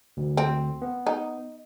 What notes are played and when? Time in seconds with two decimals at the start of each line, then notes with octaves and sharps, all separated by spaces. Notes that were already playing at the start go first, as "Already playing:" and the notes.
0.17 D2
0.37 C4
0.82 B3
1.07 D#4